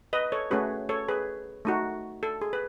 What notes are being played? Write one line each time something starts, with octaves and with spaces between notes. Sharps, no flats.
B4 D#5
A4 C#5
A3 C#4 F#4 G#4 B4
A4 C#5
G#4 B4
A3 D#4 F#4
A4
G#4
B4